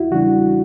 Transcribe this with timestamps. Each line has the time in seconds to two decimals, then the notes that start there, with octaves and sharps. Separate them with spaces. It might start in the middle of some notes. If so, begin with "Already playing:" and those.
Already playing: E2 E4 F#4
0.11 C#3 E3 G3 D4 F#4